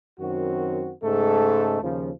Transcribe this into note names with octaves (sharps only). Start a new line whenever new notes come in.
F#2 D#3 C4 F#4
G#2 C#3 G#3 A3 A4
D#2 C#3 F3